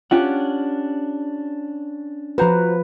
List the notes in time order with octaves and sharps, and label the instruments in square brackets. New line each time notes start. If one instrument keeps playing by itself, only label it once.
[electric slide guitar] C#4 D4 F#5 [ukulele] F4 G4 G5
[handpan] F3 B4 [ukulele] F#4 C5 A#5